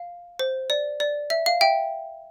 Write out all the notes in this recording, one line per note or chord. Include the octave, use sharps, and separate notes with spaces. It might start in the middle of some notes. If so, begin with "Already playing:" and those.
Already playing: F5
C5
D5
D5
E5
F5
E5 G5